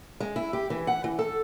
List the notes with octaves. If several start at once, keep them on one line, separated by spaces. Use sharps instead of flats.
G#3
E4
G4
E3
F#5
E3
A4